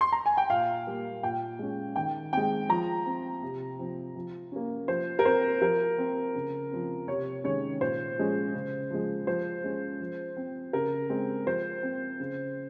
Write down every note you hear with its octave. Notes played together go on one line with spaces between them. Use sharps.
C6
A#5
G#5
G5
A#2 F5
G3 A#3
A#2 G5
G#3 C#4
D#3 G5
G#3 C4 G5
F3 A#5
C4
C3
F3 C4
F3
A#3 C#4
F3 C5
A#4
C4 C5
F3 A#4
C4
C#3
F3 C4
C3 C#5
D#3 G#3 C#4 C#5
A#2 C5
F3 G#3 C#4
C#3
F3 G#3
F3 C5
G#3 C#4
F3
C4
C#3 A#4
G#3 C4
F3 C5
C4
C#3